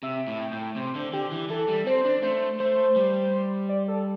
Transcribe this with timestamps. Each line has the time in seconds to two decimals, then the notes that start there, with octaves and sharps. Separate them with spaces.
0.03 C3 E5
0.27 A2
0.40 G5
0.52 A2
0.76 C3 C5
0.95 D3
1.13 D3 G4
1.32 E3
1.50 E3 A4
1.68 G3
1.86 C4 C5
2.05 D4
2.23 A3 C5
2.60 A3 C5
2.96 G3
3.69 D5
3.88 A4